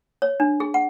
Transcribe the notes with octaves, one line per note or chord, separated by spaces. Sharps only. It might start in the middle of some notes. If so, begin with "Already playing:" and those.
C#5
D4
G#4
F#5